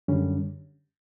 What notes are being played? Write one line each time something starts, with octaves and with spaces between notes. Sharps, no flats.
F#2 D3 G3 C#4